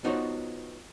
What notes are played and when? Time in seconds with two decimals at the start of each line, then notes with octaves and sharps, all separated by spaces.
0.04 B3 D#4 F4 F#4 C5 C#5